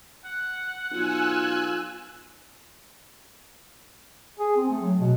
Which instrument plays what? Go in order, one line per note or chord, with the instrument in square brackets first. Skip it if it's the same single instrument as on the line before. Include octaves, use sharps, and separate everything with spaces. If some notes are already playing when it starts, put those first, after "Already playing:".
[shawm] F#5
[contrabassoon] B1 [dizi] F4 [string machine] G#5 E6 F#6
[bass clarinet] G#4
C4
A3
F#3
B2